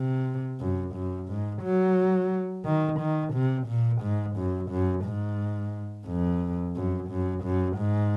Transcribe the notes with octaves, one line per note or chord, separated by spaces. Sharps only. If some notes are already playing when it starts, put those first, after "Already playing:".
Already playing: C3
F#2
F#2
G#2
F#3
D#3
D#3
C3
A#2
G#2
F#2
F#2
G#2
F2
F#2
F#2
F#2
G#2